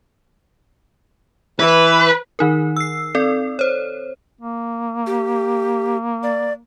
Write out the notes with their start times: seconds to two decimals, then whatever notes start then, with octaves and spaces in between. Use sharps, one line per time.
1.60 E3 B4
2.39 D#3 D#4 A#4
2.77 E6 C7
3.15 C4 A4 D5
3.59 C5 C#5
4.41 A#3
5.07 G4
6.23 D5